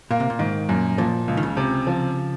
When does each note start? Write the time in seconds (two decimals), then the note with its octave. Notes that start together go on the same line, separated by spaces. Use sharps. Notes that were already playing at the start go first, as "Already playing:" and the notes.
0.11 A#2 A#3
0.20 C3
0.30 A#2
0.39 G#2 D#3
0.69 F#2 A#2
0.98 A#2 F3
1.28 C#2
1.37 D#3
1.43 C#3
1.57 C3
1.87 F3